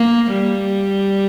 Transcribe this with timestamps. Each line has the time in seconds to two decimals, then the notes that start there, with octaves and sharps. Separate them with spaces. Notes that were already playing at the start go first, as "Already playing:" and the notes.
Already playing: A#3
0.33 G3